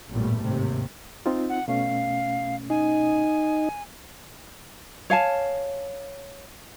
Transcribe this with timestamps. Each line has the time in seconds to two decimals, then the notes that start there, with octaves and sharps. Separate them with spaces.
0.10 A1 E2 G2 A#2 G3 A3
0.43 D#2 G#2 C3
1.26 C4 D#4 F4
1.49 F#5
1.68 B2 A3 C#4 F5
2.70 D#4 G#5
5.10 C#5 F5 G#5 A5